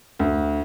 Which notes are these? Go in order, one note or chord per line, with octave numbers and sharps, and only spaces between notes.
D2